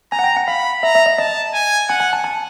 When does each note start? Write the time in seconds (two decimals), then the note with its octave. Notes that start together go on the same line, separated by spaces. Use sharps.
0.12 G#5 A#5
0.19 F#5
0.24 G5
0.36 F#5
0.47 F5 B5
0.83 E5 A#5
0.95 E5
1.06 D#5
1.18 D#5 A5
1.54 G#5
1.89 F#5 G#5
2.00 G#5
2.13 A5
2.24 A5